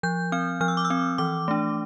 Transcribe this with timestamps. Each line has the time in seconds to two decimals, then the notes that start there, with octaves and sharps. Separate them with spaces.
0.03 F3 G6
0.32 C4 F6
0.61 F3 F6
0.68 E6
0.77 D6
0.85 E6
0.90 C4
1.18 E3 D6
1.48 A3 D4